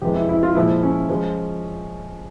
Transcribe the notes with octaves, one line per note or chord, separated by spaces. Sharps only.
F2 C3 E3 G#3 G4
E4
E4
F4
A#2 F3 G#3 E4
C#4
F3 G#3